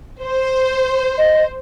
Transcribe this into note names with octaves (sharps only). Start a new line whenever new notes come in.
C5
D#5